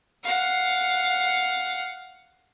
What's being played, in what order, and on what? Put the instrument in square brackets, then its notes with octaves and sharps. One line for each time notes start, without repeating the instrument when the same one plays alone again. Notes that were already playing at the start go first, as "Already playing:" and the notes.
[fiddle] F5 F#5